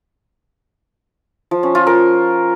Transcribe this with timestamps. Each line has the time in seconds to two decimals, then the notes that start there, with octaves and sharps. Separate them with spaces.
1.51 F3
1.63 C#4
1.75 F4
1.87 A#4